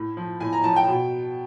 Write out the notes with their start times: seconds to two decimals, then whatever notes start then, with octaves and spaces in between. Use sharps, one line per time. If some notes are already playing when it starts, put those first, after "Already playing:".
Already playing: A2
0.17 F3
0.40 A2 G#5
0.53 A#5
0.64 F3 A5
0.76 G5
0.88 B2